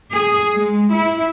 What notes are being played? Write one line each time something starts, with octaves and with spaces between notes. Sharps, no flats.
G#4
G#3
E4